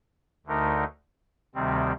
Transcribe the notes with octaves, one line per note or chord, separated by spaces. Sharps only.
D2 D3 A3 D#4 A#4
D2 C3 D#3 G3 C4